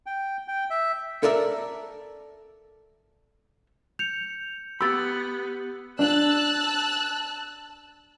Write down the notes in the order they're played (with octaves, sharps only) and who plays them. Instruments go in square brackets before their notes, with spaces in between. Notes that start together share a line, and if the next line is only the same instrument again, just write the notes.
[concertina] G5
G5
E5
[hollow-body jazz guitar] A4 A#4 D5 E5
[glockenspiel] G6 C#7 [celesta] F7
[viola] B3 [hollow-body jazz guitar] G4 B5 [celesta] E6 A6
[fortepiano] D4 [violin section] A5 E6 F#6